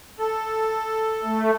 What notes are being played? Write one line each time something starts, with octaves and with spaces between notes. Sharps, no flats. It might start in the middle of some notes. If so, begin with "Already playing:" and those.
A4
A3